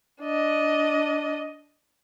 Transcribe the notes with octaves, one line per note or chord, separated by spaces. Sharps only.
D4 D#5